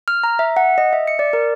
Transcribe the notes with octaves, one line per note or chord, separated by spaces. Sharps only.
F6
A#5
E5
F#5
D#5
E5
C#7
D5
A#4